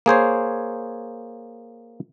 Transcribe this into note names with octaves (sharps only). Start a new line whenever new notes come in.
A#3 G#4 C5 C#5